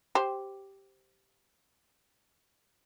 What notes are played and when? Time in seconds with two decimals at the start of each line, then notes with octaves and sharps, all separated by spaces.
0.15 G4 C5